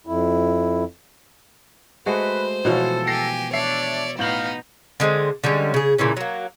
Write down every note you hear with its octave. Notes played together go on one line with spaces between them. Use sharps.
F2 E4
G#3 A3 F#4 B4 C5
B2 E3 F3 F4 F#4 A4 C#5
G4 G#5 A#6 C7
D4 C#5 D5 E5 C7
A2 B3 D#4 F5 G6 F#7
D3 G#3 A3 C4
D3 G3 G#3 C#4
C#3 G#4
A#2 C#3 E3 C#4
F#3 A#3